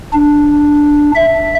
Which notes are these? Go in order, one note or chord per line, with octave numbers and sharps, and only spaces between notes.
D4
E5